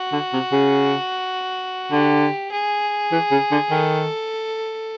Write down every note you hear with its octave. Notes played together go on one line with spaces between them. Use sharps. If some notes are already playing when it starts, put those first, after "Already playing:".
Already playing: F#4
D3
C3
C#3
D3 G4
G#4
E3
C#3
D3
D#3 A4